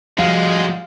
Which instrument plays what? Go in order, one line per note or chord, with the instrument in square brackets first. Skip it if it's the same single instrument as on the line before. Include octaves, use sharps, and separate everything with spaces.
[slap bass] F3 [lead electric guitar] G3 F#4 [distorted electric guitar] G#3 [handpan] F5